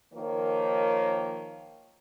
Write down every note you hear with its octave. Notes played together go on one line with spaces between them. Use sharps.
D#3 F3 A#3 A#4 C#5